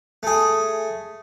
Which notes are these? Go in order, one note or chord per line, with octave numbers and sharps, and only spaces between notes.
A3 G#4